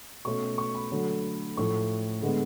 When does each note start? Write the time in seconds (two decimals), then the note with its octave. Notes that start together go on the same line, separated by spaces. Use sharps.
0.25 B2 A3 C#4 C#6
0.58 C#6
0.75 B5
0.91 D3 F#3 A3
1.57 A2 F3 A3 C#6
2.22 D3 G#3 B3